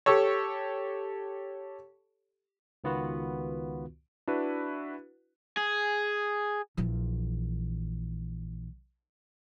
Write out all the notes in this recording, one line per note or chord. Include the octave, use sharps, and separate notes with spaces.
G4 A4 C#5
C#2 D#3 B3 F4 F#4 B4
D4 E4 F#4 B4
G#4
A#1 E3